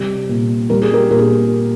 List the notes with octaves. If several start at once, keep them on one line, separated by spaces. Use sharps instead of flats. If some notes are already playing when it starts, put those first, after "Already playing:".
Already playing: C3 G3
A#2
G3 A#4
G#4
G4 A#4
A#2 A#4
G#4